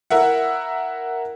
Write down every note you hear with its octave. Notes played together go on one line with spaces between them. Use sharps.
E4 A#4 E5 F#5